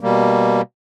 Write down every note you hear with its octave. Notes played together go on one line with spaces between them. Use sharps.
B2 G3 A#3